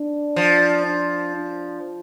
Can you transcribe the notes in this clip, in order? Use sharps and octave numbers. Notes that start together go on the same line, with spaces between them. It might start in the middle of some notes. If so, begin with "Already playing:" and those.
Already playing: D4
F3
D4
D4